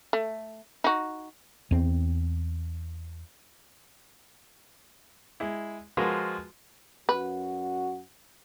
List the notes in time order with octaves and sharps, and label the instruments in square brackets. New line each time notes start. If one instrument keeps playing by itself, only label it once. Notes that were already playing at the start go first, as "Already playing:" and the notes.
[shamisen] A3
D#4 F#4
[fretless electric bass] E2 C4
[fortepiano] G#3 E4
F3 G#3 F4 F#4 A#4 B4
[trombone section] F#2 F#4 [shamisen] B4